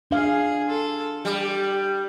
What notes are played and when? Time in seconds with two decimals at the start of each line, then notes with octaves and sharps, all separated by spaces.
0.11 D4 G#4 F5
0.67 F4 A4
1.25 G3 G4